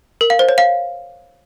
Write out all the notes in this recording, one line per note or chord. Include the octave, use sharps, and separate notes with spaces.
A#4
F5
C5
C#5
F5